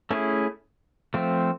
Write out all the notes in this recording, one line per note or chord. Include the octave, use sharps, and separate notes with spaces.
A3 C#4 E4 G#4
F3 A3 C4